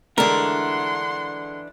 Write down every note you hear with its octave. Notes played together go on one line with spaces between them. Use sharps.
D3 E3 G#3 A3 D4 A#4 F#5 C6